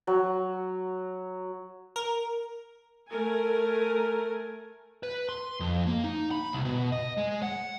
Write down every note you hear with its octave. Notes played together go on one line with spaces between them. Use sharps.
F#3
A#4
A3 A#4 G#5
B4
C6
F2
A#3
D#4
B5
C2
B2
D#5
G#3
F#5